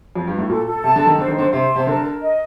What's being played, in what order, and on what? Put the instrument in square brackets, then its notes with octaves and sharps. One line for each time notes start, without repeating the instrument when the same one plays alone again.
[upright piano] F2
G2
A2
[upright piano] A#2 [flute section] A4
[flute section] A4
[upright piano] C3 [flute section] A5
[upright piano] D3
[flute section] A4
[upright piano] D#3
[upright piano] D3 [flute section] C5
[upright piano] D#3
[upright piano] D3 [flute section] C5
[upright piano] C3 [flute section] C5
[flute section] A5
[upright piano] C3
[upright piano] D3 [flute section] A#4
[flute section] A#4
D#5